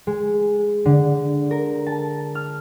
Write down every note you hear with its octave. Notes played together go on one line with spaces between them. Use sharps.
G#3
D3
A#4
A5
F6